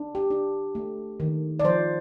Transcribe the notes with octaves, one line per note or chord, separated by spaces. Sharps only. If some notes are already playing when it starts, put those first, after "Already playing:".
Already playing: D4
G4
D4
A3
D#3
D5
F3 C5